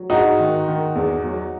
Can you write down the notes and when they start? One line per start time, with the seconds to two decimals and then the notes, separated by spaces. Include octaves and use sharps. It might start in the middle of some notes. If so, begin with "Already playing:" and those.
Already playing: F#3
0.10 G#2 D#4 F#4
0.39 D#3
0.68 D#3
0.96 E2
1.24 F#3